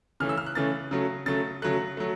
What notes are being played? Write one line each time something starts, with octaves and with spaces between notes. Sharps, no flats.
C#3 E3 A3 C#4 F6
E6
F6
F#6
C#3 E3 A3 C#4 A6
C#3 F#3 A3
C#3 F#3 A3 A6
C#3 F#3 A3 F#6
F#3 A3